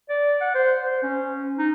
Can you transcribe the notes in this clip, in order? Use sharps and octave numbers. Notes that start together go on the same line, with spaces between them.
D5
F#5
C5
C5
C#4
D#4